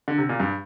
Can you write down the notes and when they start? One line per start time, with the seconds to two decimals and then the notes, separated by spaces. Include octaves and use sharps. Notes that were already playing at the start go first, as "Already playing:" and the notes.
0.08 D3
0.18 C3
0.29 A#2
0.40 G2